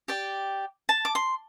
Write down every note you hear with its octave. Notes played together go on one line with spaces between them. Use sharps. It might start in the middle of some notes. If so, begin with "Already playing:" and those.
G4 D5 G5
A5
D6
C6